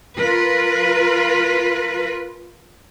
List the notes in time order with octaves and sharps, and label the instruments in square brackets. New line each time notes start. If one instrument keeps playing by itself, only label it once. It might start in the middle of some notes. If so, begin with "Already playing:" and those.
[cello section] F4 A#4 B4